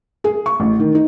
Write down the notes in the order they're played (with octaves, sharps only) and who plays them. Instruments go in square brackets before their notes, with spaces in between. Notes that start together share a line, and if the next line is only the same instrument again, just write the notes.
[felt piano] G#4
C#6
A1
D#3
D#4